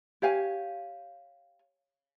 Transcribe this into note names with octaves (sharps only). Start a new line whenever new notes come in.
G4 C#5 F5 G#5